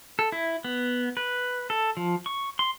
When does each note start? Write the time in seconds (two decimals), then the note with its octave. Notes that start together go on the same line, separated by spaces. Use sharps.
0.19 A4
0.32 E4
0.64 B3
1.17 B4
1.70 A4
1.97 F3
2.26 C#6
2.59 C6